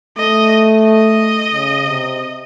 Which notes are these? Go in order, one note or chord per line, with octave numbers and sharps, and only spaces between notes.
A3 D#5
D#5
C#3
C3